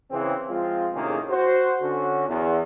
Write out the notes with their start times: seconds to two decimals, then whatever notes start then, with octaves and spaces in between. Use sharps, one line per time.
0.11 C#3 E3 C4
0.50 F3 G#3 C4 F4
0.93 A2 C3 D#3 A#3 C#4 G#4
1.30 F#4 C5
1.81 D3 C#4 F#4
2.28 E2